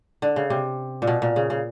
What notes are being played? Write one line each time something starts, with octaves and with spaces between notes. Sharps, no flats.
D3
C#3
C3
A#2
B2
A#2
C#3
C#3